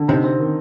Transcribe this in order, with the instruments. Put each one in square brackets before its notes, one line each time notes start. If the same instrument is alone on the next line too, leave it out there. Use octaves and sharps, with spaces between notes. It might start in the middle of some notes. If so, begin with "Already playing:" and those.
Already playing: [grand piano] D3
[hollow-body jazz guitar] C3 [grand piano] D#4
[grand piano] C4
D#3